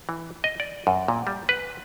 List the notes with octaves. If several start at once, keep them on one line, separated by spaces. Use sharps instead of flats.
E3
D#5
D5
F#2
A#2
G3
B4